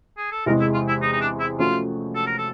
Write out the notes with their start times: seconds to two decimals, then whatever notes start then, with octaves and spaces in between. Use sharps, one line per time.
0.18 G#4
0.32 A4
0.46 E2 C3 E3 G#3 A#4
0.60 E4
0.74 F4
0.88 E4
1.02 D#4
1.12 D#4
1.21 D4
1.40 E4
1.59 F3 A3 C#4 F4 F#4
2.15 A4
2.27 A#4
2.38 A4